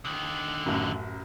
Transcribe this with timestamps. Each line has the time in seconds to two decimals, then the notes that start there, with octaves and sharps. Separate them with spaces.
0.05 D3 D#3
0.66 A1 F#2